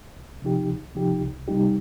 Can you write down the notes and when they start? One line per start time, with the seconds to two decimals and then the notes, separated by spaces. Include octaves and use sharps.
0.17 C2
0.42 C3 F3 D#4 G4
0.69 C2
0.95 C3 F3 D#4 G4
1.21 C2
1.48 C3 G3 D#4 G4